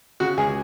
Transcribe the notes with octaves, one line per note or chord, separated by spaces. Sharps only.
C#3 F#4
C#2 G#4